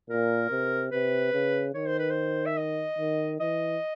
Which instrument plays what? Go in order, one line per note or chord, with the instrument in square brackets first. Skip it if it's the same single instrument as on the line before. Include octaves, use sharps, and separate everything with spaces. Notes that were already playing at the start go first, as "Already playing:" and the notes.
[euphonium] A#2 [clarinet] A#4
[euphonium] C3
[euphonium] C3 [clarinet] B4
[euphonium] C#3
[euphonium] D#3 [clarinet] C#5
[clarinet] C5
B4
C5
E5
D#5
[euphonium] D#3
[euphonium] E3 [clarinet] D#5